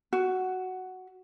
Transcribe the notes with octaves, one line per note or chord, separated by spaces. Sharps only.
F#4